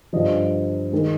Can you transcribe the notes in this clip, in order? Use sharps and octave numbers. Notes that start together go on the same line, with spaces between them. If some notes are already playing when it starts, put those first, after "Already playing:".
G2 D3 F3 D#5
D#3 G#3